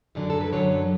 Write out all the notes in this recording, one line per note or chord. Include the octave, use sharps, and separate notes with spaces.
F#2 D3 F#3 D5
A4
B4
F#2 D3 F#3 C#5